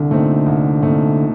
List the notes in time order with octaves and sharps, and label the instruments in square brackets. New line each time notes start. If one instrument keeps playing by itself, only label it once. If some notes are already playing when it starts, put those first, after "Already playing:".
Already playing: [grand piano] C2 [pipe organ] D3
[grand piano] A#2 A3 C4 D#4
C2
A#2 A3 C4 D#4